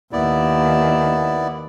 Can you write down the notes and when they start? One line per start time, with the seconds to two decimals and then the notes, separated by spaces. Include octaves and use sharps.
0.12 D#2 D#3 B3 E4 D5